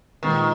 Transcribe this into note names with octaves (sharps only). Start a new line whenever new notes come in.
A#2 D#3 F3 G#3 B3 D#4